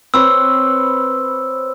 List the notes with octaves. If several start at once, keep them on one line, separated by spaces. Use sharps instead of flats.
C4 B4 C#5 E6